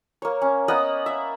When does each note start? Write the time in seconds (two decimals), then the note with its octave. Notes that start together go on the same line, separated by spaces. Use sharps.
0.22 A#3 C#5
0.42 C#4
0.68 A#3 B3 D#5 F#5
1.06 E5